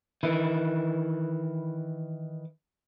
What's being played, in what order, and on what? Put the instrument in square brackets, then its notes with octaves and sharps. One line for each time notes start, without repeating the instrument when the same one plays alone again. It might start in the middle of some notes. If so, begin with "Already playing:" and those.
[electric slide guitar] D#3 E3 E4